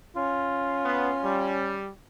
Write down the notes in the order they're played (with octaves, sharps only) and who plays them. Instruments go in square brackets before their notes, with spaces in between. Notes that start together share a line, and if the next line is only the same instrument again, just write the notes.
[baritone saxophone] C#4 [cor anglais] F4
[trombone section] B3
G3